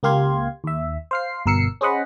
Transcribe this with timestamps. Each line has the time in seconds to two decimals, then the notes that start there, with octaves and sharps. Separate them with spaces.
0.03 C#2 A#3 G4 F5 C6 G#6
0.64 D#2 E5
1.11 C5 F5 C7
1.46 G1 B2 A#4 E6 C7 C#7
1.81 C#4 G#4 C5 D#5 F#5 B5